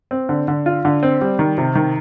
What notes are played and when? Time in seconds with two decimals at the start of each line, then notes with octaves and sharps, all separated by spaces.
0.11 C4
0.29 D3
0.48 D3
0.66 F4
0.85 D3
1.03 C4
1.21 G3
1.39 D#3
1.58 C3
1.75 D#3